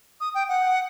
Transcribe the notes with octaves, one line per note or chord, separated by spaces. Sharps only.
D#6
G5
F#5